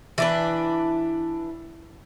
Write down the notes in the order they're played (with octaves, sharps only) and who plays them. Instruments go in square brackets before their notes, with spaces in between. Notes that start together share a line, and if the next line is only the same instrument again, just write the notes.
[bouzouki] E3 D4 B4